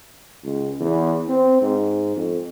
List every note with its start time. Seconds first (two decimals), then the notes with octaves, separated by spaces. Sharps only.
0.44 C#2
0.80 E2
1.28 C4
1.62 G#2
2.16 F2